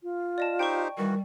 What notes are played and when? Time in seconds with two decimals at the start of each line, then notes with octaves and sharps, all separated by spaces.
0.03 F4
0.38 D5 D#5 A5
0.59 D#4 G4 C5 G5 C#6
0.98 D#3 E3 G3 F#4 A#4